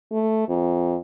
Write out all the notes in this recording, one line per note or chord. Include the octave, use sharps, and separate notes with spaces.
A3
F2